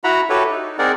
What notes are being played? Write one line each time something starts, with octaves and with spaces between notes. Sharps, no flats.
E4 F#4 F#5 A#5 B5
E4 F#4 G4 A4 B4 C#5
D#4
C4 D#4 G#4 A#4 D5 F#5